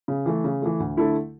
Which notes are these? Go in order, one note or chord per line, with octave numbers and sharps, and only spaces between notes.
C#3
E3 A3
C#3
E3 A3
D2
D3 A3 E4 A4